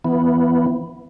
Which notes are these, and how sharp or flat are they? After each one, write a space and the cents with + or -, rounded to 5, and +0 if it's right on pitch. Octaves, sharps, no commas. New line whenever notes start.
E3 +25 B3 +0